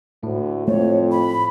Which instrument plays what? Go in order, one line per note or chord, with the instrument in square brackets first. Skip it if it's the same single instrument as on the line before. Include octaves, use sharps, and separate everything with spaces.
[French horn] D2 [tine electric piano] A2
[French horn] F2 [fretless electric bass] A3 [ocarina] C#5
[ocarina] B5